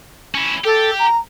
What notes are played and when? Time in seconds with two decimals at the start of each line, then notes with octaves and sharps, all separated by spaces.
0.35 C#4 E4
0.65 G4 A4
0.98 A#5